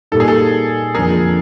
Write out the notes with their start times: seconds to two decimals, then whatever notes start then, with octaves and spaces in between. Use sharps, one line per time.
0.12 A#2 G3 A#3 D#4 A4
0.20 G#4
0.28 A4
0.95 F2 D3 F3 A#3 G#4 A#4